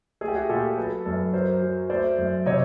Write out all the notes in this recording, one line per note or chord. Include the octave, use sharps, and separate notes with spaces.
A3 G#4
G4
F#4 G#4
A#2 G4 A4
F#3 A4 B4
F#2 A4 B4
F#3 A#4 C5
F#3
A3 C5 D5
F#2
C3 C#5 D#5